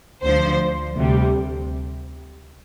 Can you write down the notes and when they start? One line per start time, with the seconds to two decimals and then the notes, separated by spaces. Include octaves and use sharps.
0.22 D2 D3 F3 C5
0.95 D2 C3 G3